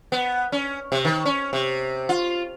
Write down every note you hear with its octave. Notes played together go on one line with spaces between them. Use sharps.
B3
C#4
C3
D#3
C#4
C3
F4